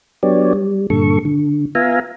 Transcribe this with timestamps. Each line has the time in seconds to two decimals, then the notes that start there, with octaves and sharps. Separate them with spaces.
0.23 F#3 B3 D4 G4 C#5 D5
0.53 G3
0.90 G2 A#2 D3 A4 C#6
1.25 D3
1.75 B3 F4 E5 F5 G#5 A#5